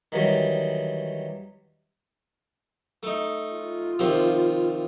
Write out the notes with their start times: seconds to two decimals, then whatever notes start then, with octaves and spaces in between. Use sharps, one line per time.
0.12 D#3 E3 F#3 G3
3.03 A3 D#4
3.53 F4
3.99 C3 D#3 F3